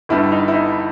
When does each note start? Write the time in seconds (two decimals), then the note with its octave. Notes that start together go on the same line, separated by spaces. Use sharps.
0.09 G1 G2 G3 E4
0.32 D#4
0.48 E4
0.54 D#4